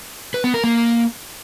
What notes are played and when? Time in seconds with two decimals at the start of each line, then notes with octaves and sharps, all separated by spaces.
0.34 B4
0.44 B3
0.54 A#4
0.64 A#3